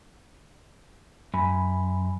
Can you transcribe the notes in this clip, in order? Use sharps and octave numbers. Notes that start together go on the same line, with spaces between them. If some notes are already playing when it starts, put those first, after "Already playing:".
F#2 G#5 B5